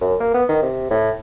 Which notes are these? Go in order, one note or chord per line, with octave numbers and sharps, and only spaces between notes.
F#2
A#3
B3
D#3
C3
A2